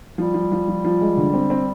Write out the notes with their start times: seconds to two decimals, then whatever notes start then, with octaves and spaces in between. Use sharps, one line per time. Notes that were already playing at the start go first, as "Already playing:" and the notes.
0.18 F3 G3
0.34 F3
0.52 F3
0.68 F3
0.84 F3
1.01 G#3
1.17 D3
1.34 C4
1.50 C4